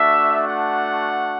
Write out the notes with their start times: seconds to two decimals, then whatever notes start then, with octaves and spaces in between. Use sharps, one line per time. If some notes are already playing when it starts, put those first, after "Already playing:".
Already playing: A3 D4 F#4 E5
0.47 F#5